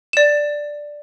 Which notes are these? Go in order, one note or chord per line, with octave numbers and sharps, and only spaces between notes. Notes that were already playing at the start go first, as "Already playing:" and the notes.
D5 E7